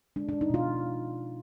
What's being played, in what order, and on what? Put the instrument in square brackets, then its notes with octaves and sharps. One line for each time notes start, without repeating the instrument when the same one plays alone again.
[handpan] G#3 D4
D4
G#3
D#4
B2 F4